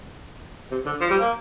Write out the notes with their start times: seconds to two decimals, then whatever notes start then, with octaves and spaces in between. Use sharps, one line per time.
0.71 C3
0.86 D3
1.01 F3
1.10 G3
1.20 A#3